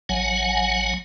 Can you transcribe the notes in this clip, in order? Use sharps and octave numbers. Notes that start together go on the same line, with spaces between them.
A1 F#3 F#5 G#5